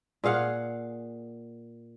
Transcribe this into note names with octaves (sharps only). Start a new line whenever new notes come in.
A#2 G#4 F5 F#5